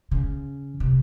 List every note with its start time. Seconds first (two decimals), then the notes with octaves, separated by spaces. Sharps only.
0.11 C#3
0.80 C3